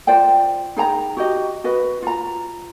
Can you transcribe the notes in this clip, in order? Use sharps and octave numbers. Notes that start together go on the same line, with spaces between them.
F4 C5 D5 G5
D#4 G#4 G5 A#5
F#4 G4 D#5
F#4 B4 D#5
F4 A#5